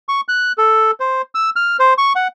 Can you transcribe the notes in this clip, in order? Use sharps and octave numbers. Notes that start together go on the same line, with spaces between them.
C#6
F#6
A4
C5
E6
F6
C5
C#6
F#5